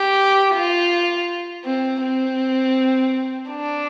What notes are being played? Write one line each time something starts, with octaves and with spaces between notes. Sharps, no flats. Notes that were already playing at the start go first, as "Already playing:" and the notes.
Already playing: G4
F4
C4
C4
D4